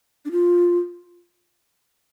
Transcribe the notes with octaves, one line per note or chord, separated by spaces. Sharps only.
D4
F4